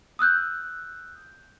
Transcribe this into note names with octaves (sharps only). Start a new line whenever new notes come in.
D#6 E6 F#6 G6